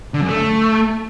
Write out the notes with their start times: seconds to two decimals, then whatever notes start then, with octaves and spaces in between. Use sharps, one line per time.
0.14 D3
0.21 F#2
0.28 A3